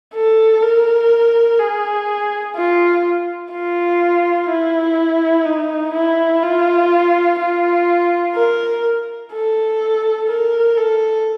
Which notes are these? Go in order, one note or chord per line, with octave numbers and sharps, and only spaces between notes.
A4
A#4
G#4
F4
F4
E4
D#4
E4
F4
F4
A#4
A4
A#4
A4